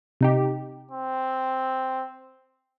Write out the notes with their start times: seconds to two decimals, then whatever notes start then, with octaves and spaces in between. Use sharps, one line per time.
0.21 C3 D#4 G4
0.91 C4